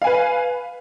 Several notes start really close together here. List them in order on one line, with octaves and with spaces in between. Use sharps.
F5 G#5 B4